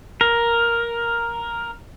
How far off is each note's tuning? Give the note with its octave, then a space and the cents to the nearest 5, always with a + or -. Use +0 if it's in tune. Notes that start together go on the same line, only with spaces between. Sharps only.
A#4 +5